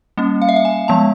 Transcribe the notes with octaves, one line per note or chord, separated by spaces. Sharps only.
G3 A#3 C#4
F5
E5
F5
G#5
F3 G#3 B3 A5